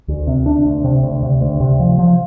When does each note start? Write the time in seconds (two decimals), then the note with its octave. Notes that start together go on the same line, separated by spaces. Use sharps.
0.08 D2
0.27 C3
0.46 D4
0.66 D2
0.84 C3
1.03 D2
1.23 C3
1.41 D2
1.60 C3
1.80 F3
1.98 F3